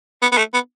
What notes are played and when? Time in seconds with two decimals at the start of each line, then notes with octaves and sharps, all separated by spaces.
0.22 B3
0.32 B3
0.38 A3
0.54 B3